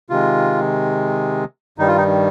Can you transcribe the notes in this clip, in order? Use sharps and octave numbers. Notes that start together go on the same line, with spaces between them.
C3 D#3 G#3 F4
G2 D#3 G3 D#4
F4
D#4